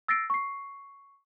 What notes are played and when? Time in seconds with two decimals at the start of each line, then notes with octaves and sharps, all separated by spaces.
0.08 E6 A6 A#6 C7 D7
0.30 C#6 C7